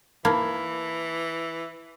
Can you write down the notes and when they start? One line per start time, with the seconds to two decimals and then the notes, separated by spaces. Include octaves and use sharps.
0.25 E3 A#3 A5 B5 G#6